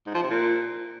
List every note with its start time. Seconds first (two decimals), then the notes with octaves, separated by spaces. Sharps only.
0.06 G#2
0.14 F3
0.22 C3
0.30 A#2